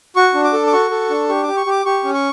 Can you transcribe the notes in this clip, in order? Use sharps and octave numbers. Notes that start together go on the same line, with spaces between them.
F#4 C#6
D4
D6
A4
D6
F#4 C#6
A4
D4
G4 C#6
G4 D6
C#6
G4 D6
G4 C#6
C#4
C#6